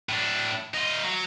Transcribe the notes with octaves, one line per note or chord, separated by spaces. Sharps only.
A2 D4
D#4 F4
F#3